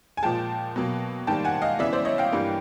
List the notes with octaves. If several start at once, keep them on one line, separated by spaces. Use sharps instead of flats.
G#5
A#2 F3 G#3 G5 A5
B2 F#3 A#3
G#2 D#3 G3 A#3 G5 A5
F#5 G#5
D#5 F5
C#3 E3 G#3 B3 D5 E5
C5 D5
C#5 D#5
F5 G5
G2 E3 G3 A#3